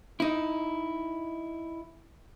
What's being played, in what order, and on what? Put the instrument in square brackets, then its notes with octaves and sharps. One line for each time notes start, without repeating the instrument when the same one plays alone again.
[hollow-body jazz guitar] D#4 E4